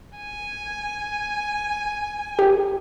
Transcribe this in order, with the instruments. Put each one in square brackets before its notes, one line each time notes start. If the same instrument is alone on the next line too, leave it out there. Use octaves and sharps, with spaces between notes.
[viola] G#5
[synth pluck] G4